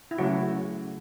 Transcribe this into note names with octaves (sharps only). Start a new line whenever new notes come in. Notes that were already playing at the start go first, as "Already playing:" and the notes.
E4
C#3 F#3 A3 F#4